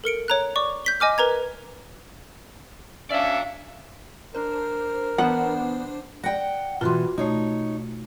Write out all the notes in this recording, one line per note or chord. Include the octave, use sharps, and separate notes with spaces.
A4 A#4 C#7 D7
C#5 A#5 F#6
D5 C#6 D6
G6 B6 G7
D#5 G#5 D6 F6
A#4 B4 A#5 G#6
C#4 D4 D5 E5 F5
D4 A#4 C5
E3 B3 D4 C5 F#5
D5 F#5 G5 A#6
B2 D#3 E3 F4 F#4 C6
B2 A3 D#4 C#5